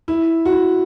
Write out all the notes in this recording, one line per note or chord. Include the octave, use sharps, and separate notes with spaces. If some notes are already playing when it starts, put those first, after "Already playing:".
E4
F#4
E4